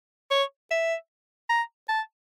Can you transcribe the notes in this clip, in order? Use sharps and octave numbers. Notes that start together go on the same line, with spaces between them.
C#5
E5
A#5
A5